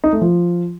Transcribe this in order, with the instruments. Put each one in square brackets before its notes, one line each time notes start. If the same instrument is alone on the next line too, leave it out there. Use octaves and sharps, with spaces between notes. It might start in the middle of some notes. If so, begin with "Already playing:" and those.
[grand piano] D#4
A3
F3